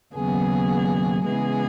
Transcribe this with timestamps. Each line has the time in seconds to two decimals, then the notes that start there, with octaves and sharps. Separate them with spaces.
0.14 D#2 C#3 F#3 B3 G#4
1.24 C#3 E3 G#3 B3 G#4